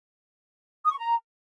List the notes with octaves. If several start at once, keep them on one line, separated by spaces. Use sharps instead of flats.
D#6
C#6
A#5